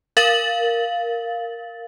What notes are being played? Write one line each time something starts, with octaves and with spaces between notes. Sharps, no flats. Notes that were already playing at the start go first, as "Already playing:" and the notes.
A#4 F5 A6 F#7